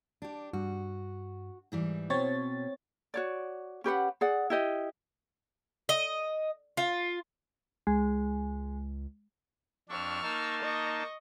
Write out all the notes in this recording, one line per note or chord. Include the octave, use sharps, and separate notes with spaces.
D4 G4
G2 F#4
G#2 E3 G3
B2 C4 C#5 A6
F#4 C#5 D5
C#4 G4 B4 F#5
G#4 D5 F#5
E4 G4 D#5
D#5
F4
C#2 G#3
F2 D4 C#6 E6 F6
A#3 D#4 A5
D#5 C#6